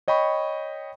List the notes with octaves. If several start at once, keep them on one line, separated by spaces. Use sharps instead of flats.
C#5 D#5 G5 B5 C#6